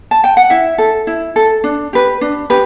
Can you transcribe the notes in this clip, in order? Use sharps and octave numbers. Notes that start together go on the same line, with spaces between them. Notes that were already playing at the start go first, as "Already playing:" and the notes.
A5
G5
F#5
E4 E5
A4
E4
A4
D4
G4 B4
D4
G4 B4